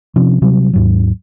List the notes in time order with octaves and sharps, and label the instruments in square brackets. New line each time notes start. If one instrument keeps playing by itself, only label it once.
[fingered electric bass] C3 F3 C#4 D4
C3 F#3 G3
D#2 G#2 F#3